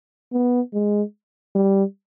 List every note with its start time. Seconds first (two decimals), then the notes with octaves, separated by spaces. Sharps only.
0.33 B3
0.74 G#3
1.55 G3